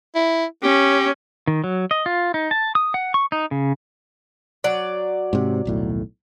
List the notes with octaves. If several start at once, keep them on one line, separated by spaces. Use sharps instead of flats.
E4
C#4 G4
D#3
F#3
D#5
F4
D#4
A5
D#6
F#5
C#6
D#4
C#3
F#3 D5
G#2 C3
D#1 B1 A2